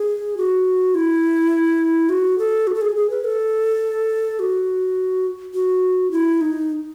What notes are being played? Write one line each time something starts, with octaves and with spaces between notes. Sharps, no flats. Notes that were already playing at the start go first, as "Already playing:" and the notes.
Already playing: G#4
F#4
E4
F#4
A4
F#4
A4
G#4
G#4
B4
A4
F#4
F#4
E4
D#4